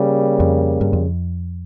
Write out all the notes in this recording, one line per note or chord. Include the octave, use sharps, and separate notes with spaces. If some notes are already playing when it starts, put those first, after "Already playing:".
Already playing: C#3 G3 A#3
F2
G2
F2